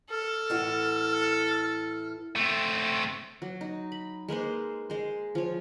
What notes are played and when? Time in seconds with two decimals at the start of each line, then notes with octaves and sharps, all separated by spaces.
0.10 A4 F6
0.50 A2 E3 F#4
2.36 A3 C4
3.42 F#3
3.61 D#4
3.92 B5
4.29 G#3 A#3 B4 C5
4.90 G#3 C5
5.35 F3 C#5